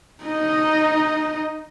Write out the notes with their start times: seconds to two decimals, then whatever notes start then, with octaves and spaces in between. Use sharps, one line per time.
0.24 D#4 D#5